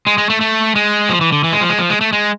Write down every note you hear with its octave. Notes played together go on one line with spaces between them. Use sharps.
G#3
G#3
A3
A3
G#3
F3
E3
D3
E3
G#3
F3
G#3
F3
G#3
A3
G#3